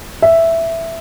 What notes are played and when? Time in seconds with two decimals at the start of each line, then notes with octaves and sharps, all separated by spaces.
0.22 E5